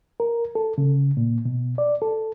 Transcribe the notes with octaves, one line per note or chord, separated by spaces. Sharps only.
A#4
A4
C#3
A#2
B2
D5
A4